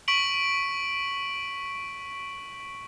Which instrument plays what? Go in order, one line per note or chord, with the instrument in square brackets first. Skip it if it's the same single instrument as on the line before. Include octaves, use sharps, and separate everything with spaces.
[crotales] C#6 B6 D7 F#7